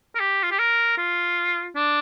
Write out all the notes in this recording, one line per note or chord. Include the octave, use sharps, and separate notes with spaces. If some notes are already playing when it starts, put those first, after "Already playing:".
A#4
G4
F4
G4
A#4
F4
D4